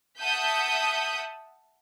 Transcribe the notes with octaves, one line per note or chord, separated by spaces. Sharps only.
E5 F#5 A5 D#6 G6 B6